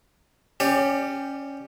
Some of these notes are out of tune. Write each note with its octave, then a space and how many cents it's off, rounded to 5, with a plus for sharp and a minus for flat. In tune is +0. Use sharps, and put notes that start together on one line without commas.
C#4 +0 G4 +0 D5 +25